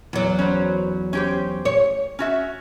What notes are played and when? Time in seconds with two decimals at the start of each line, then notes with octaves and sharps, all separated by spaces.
0.13 E2 F#3
0.39 C#4 B4 C5
1.13 C#4 G4 C5
1.65 C#5
2.19 C#4 F#4 E5